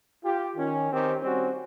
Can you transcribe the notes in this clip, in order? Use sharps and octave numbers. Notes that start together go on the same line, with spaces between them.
F4 G4
D#3 C#4
D#3 C4 G4
G3 C4 C#4 F#4